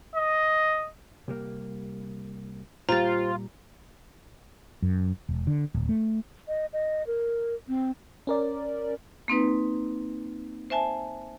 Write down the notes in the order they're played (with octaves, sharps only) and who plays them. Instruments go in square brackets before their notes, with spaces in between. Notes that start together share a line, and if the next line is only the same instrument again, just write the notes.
[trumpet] D#5
[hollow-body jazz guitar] C2 G3 A#3
[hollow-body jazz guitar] A#2 G3 [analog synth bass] F4 [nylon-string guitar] G4 C5 [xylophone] A#5 A6
[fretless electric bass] F#2
E1
D3
D1
A3
[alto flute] D#5
D#5
A#4
C4
[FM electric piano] C#4 A#4 D5
[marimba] A#3 C4 D#4 B4
C5 E5 G#5 A5